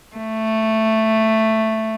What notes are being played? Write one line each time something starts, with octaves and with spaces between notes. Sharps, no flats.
A3